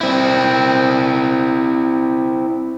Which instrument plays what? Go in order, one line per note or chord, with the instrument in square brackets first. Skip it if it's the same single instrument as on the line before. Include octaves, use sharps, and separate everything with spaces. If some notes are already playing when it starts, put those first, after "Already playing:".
[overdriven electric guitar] C4 E4